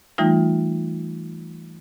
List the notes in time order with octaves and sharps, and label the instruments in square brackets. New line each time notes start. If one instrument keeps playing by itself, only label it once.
[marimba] E3 G3 A3 D#4 F4